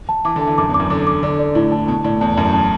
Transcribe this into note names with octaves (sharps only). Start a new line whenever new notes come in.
A5
E3 D6
D3
A5
E3
F#2 D6
E2
D6
F#2
D3 D6
D6
D3 D5
D5
A2 E4
A5
B2 A5
A2 D5
E2 A5
F#2 A5
A5